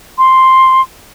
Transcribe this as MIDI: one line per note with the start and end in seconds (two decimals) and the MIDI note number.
0.18 0.81 84